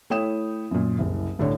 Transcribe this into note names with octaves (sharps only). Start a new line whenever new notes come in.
A3 E4 C#5 G5 D#6 E7
F#2 A#2
F#1 C2
C2 A2 D3 C#5